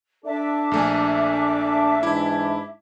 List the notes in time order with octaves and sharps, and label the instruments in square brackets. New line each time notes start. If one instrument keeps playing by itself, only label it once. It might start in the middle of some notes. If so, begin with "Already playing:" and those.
[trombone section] D4 A4 [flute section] E5 D6
[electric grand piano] A#1 A3 G#5
[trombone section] G#2 E3 D4 [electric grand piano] E4